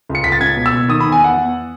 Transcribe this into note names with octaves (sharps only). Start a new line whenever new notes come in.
C#2
C#7
C#2 B6
A6
C#2 G#6
B2
E6
B2
D#3 D#6
B5
E2
G#5
E2 F#5
E2